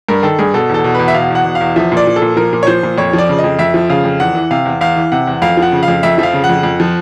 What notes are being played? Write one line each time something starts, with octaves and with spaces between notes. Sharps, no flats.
G2 A#4
D#3 A4
G2 G#4
B2 A4
E2 A4
B2
E2 B4
E5
B2 F5
E2 F#5
B2
F5
E2
F3 E5
A#2
D5
F3
A4
A#2
F3 A#4
A#2
C#5
F3 C5
A#2
F2 C#5
F3
D5
C#3
D#5
F2
F2 E5
F3
C#3 F5
F2
E2 F#5
E3
C3 F5
E2
E2 F5
E3
C3 F#5
E2
F2 F5
F3
F#5
C#3
F5
F2
F2 E5
F3 E5
F5
C#3
F#5
F2
F2
F3